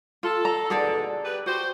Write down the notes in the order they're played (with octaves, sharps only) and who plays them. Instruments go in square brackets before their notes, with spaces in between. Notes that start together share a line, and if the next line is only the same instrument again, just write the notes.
[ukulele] F4 [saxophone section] A4
[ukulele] A#5
[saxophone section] D#2 B2 D3 [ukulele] G#4 A4 D5
[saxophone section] G4 B4
[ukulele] F#4 [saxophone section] G4 C5